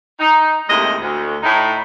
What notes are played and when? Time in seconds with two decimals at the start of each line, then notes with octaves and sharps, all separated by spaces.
0.20 D#4
0.69 D#2 A2 C3 G#3 E4 D#5
1.01 D2
1.43 A2 D#4 E4